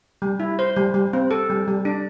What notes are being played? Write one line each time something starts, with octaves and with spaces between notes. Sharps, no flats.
G3
E4
C5
G3
G3
C4
A4
G3
G3
D4